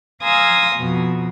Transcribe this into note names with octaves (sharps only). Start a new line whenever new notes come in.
F5 G#5 A#5 C6 D#6 E6
F2 B2